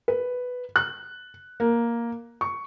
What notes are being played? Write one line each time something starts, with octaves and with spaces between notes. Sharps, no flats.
B4
F#6
A#3
C#6